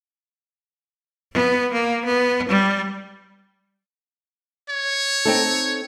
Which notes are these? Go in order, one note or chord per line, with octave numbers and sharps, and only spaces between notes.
B3
A#3
B3
G3
C#5
C4 D#4 A4